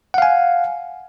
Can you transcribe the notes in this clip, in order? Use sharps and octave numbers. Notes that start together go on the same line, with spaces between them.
F5 F#5 G#5